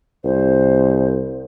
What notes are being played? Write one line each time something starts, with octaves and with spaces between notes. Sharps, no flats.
C2 C5